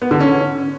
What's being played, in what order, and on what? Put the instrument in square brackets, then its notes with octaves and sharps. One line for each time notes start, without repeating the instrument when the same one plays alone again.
[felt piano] B3
D3
C#4